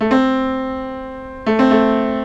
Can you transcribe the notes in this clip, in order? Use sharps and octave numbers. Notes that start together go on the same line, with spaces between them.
A3
C4
A3
C4
A3